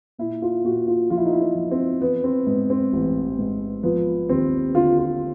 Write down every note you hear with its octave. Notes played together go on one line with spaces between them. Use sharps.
A#2 E4
F4
A#2 F#4
F4
F3 F4
E4
D#4
E4
D#4
F3
C4
E3 B3
C4
G#2 B3
C4
A1
G#2
F3 B3
D#2 C4
D3 F4
F4